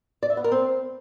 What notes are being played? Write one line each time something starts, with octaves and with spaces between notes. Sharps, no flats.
D5
E5
B3
A#4
C4